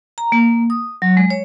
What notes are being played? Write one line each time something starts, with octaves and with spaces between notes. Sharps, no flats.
A#5
A#3
D#6
F#3
G#3
C#5